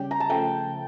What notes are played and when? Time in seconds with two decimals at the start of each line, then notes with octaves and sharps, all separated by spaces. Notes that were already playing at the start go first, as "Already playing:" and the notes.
Already playing: C#3 G3 C#4 G4 G5
0.11 A#5
0.20 A5
0.29 C#3 F3 A3 G5